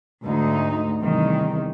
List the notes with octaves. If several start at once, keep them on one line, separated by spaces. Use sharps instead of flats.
D2 G#2 D#4
E2 G2 C3 D#3